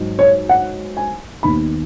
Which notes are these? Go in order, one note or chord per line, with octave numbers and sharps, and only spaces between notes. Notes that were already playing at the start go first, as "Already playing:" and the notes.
Already playing: G#2 F#3 D#4
C#5
F#5
G#5
D#2 D#3 B3 D#4 B5